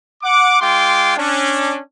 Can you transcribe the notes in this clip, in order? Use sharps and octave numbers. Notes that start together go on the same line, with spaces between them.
F#5 D6
G#3 F4 G5 C6 D6
C#4 D4